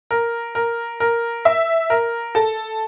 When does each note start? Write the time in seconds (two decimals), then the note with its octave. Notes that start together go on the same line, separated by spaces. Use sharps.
0.11 A#4
0.55 A#4
1.00 A#4
1.45 E5
1.90 A#4
2.35 A4